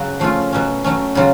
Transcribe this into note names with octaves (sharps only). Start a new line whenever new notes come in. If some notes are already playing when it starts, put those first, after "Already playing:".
Already playing: C#3 F#3 F#4
F3 A3 C#4 F4
B2 F#3 C#4
F#3 A3 C#4
C#3 F#3 F4